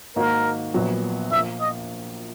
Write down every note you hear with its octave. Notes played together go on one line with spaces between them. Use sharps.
G#2 D#3 A#3 D#4 F#4 A#4
A#1 A#2 F#3 B3
A#1 A#2 A#3 E5
D#5